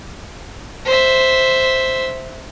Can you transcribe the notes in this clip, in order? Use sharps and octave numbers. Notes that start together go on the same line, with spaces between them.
C5 E5